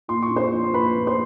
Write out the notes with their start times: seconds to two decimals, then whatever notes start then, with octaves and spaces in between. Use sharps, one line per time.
0.08 A#2 C6
0.22 C#6
0.30 D4
0.36 C5 C6
0.52 F3
0.64 C6
0.74 A#2 B4 B5
0.96 F3
1.07 C5 C6